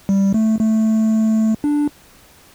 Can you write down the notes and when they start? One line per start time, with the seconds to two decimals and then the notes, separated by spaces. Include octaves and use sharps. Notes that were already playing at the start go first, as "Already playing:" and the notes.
0.09 G3
0.34 A3
0.61 A3
1.64 D4